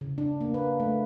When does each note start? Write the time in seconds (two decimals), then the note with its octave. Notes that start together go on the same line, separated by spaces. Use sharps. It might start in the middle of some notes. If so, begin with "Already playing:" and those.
0.01 C#3
0.18 D4
0.41 A#3
0.54 B4
0.80 A3